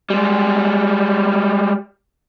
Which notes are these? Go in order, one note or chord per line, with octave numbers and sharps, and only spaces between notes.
G3 G#3